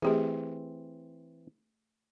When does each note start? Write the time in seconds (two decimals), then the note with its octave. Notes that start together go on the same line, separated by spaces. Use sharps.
0.02 E3 A3 C4 G4 G#4